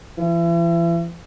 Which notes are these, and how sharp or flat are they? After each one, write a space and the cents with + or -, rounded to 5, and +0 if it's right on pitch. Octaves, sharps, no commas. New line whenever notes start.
E3 +40